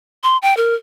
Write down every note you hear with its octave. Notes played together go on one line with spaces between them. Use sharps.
C6
G5
A#4